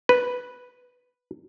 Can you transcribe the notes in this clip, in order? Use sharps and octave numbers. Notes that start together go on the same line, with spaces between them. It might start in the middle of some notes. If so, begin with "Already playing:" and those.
B4